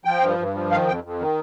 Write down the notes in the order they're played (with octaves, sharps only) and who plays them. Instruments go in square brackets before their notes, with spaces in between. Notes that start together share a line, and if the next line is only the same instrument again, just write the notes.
[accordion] F3 G5
G2
G2
F3
D#3 F5
F2 G5
F2
D#3